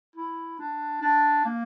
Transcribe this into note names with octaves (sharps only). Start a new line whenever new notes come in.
E4
D4
D4
A#3